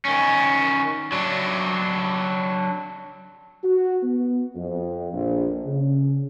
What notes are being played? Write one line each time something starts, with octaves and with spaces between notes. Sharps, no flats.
D#3 C#4
F#3 D4
F#4
B3
F2
A#1
C#3